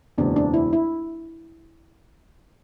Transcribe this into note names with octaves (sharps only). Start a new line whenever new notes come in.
F#1 E2 B2 G#3 C4 D4
D4
E4
E4